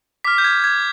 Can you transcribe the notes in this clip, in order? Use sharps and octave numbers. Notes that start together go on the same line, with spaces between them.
D6 F6 B6
G6
G#6
G#6